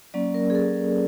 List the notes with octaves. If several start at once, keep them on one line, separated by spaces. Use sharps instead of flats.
F#3 A#3 C#4 D5
A#4
G#4
A4